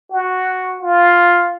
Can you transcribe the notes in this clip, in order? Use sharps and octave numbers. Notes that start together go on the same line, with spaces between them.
F#4
F4